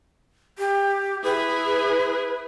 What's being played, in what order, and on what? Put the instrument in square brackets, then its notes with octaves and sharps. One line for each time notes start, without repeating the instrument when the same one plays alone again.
[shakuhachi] G4
[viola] E4 G#4 [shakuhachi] B4